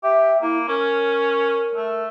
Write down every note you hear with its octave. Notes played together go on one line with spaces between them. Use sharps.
G4 E5
A#3 E4
C#4 A#4
A3